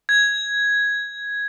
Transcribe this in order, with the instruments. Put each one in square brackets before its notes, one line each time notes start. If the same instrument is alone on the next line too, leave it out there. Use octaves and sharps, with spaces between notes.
[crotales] G#6